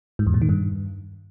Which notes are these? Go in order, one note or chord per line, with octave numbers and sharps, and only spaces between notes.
G#2
E2
A#2
D#3
G2